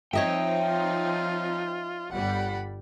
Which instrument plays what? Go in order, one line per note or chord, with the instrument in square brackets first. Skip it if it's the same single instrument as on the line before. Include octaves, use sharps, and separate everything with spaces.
[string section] F3 C4 D#4 [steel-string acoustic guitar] C#5 D#5 E5 [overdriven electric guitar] G5
[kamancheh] F4
[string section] G1 G3 D5 [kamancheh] F#5 B5